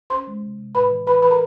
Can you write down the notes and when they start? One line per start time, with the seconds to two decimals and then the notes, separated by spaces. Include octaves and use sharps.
0.10 C#4 C5 C6
0.27 G#3
0.42 C3
0.59 C3
0.75 A2 B4 B5
0.91 E3
1.07 E3 B4 B5
1.22 E3 B4 B5
1.31 A#4 A#5